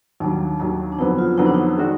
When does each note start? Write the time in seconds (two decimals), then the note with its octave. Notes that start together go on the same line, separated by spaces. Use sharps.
0.20 D#2 D#3 F#3 D4
0.60 D#2 D#3 F#3
0.92 D4
0.98 F2 D3 F#3 B3 D#4
1.18 F4
1.37 F2 D3 F#3 B3 D#4
1.46 D4
1.54 D#4
1.77 D#3 G#3 D4 F#4